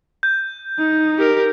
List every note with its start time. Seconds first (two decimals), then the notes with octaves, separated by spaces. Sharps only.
0.23 G6
0.79 D#4
1.18 G4 A#4